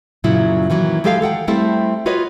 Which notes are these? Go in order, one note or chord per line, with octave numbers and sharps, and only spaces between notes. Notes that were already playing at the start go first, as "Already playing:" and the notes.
F#2 A#2 C#3 F#3 E4
D#3 E3 F#3 A#3
F#3 G#3 G4 A4 D#5 F5
A4 F#5 G5
G3 A3 C4 E4 G4 A4
F4 F#4 B4 C#5 D#5